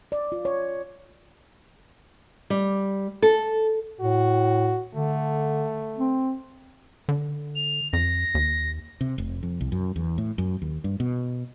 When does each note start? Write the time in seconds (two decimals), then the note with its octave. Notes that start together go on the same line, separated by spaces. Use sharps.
0.12 D5
0.32 F4
0.45 C#5
2.50 G3
3.22 A4
4.00 A2 F#4
4.95 D3 A3
5.98 C4
7.09 D3
7.56 F7
7.93 F2 A#6
8.35 D#2
9.01 C3
9.18 F1
9.43 F2
9.61 C2
9.72 F#2
9.96 E2
10.18 A2
10.38 F#2
10.62 D#2
10.84 G2
11.00 B2